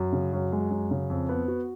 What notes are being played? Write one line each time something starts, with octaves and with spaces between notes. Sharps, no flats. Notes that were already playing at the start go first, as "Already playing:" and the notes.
Already playing: F#2
C#3
F#2
G#3
F#2
C#3
F2
B3
F#4